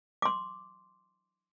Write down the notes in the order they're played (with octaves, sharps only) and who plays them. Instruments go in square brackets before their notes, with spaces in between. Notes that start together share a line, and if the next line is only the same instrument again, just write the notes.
[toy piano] C6 D6